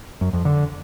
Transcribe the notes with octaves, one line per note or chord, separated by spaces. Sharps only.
F#2
F2
D3